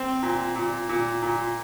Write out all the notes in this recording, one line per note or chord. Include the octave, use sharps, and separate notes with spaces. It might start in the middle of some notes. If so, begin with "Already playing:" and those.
Already playing: C4
A#2
A#2
A#2
A#2